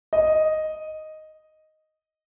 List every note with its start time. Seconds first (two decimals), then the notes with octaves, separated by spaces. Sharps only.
0.13 D#5